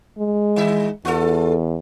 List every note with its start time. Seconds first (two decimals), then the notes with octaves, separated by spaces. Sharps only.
0.18 G#3
0.56 D#3 E5
1.05 E2 F4 A4